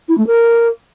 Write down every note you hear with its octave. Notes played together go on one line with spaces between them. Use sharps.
E4
A3
A#4